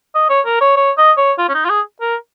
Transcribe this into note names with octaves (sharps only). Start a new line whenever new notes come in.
D#5
C#5
A#4
C#5
C#5
D#5
C#5
F4
C#4
D#4
F4
G#4
A#4